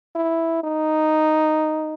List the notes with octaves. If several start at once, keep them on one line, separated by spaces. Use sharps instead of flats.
E4
D#4